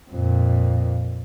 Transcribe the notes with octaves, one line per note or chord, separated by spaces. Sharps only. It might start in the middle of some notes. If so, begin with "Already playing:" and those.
F2 A#2